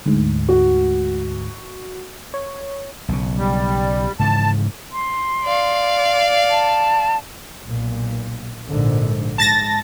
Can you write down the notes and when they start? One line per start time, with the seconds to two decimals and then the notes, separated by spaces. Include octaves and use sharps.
0.06 D2 G#2
0.49 F#4
2.34 C#5
3.09 B1 C#3
3.37 G3
4.20 G#2 C#3 E3 A5
4.93 C6
5.44 D5 F5
6.50 A5
7.65 B1 A#2
8.68 A#1 G#2 D3
9.38 G#2 A5 A6 A#6